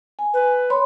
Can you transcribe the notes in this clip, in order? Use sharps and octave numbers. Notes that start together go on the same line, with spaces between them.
G#5
B4
C#5 B5 C6